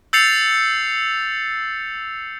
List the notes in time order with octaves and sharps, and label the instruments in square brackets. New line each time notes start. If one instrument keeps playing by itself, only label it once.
[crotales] E6 G6 A6 C7 C#7 F7